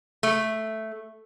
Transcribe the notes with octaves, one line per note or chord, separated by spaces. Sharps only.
A3